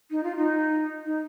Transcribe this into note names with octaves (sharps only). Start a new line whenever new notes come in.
D#4
F4
D#4
D#4